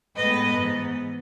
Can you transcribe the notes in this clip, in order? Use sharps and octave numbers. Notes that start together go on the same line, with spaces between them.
A2 G#3 B3 B4 D#5
G#2 E3 B3